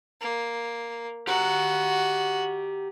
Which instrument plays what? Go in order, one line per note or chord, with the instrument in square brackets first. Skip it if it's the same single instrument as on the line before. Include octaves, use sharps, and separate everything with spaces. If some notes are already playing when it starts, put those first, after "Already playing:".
[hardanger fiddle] A#3
[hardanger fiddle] F#4 [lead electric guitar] G4 A#5